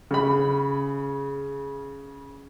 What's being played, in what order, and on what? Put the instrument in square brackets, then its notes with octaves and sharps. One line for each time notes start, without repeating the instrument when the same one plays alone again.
[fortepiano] C#3 B5